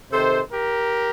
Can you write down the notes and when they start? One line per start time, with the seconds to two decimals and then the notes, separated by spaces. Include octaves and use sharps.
0.12 C3 D#3 A4 C5
0.52 G4 A#4